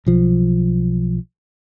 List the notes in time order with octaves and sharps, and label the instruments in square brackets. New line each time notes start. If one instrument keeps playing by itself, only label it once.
[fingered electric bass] B1 F3